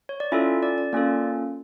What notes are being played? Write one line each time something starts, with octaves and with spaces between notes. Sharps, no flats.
C#5
D5
C#4 E4 F4 A4 E5
D5
D5
A#3 C#4 F4 A4 D5